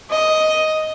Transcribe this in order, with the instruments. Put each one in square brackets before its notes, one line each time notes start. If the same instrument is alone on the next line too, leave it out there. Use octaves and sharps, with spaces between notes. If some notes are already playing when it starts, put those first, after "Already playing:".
[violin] D#5